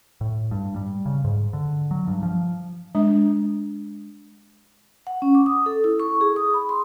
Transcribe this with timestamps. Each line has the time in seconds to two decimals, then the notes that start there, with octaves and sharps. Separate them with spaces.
0.21 A2
0.51 G2
0.76 G3
1.06 C#3
1.25 G#2
1.53 D3
1.91 F#3
2.07 G2
2.23 F3
2.95 G#3 D4
5.07 F#5
5.22 C#4
5.35 D6
5.46 D#6
5.66 A4
5.84 E4
6.00 C#6
6.21 G#4
6.36 D#6
6.54 B5
6.69 C6